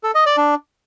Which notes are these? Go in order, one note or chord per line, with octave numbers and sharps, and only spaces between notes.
A4
D#5
D5
D4